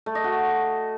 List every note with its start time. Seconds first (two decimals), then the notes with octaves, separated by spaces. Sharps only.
0.06 A3
0.15 D#5
0.24 F#4